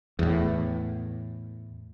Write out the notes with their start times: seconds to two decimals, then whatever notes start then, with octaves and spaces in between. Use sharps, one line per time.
0.19 E2 A2